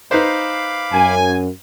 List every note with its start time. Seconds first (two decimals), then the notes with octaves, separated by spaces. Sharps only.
0.11 D#4 B4 C5 F5 B5 D6
0.93 F#2 G#5